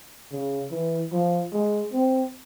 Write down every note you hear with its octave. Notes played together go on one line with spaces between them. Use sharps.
C#3
E3
F3
G#3
C4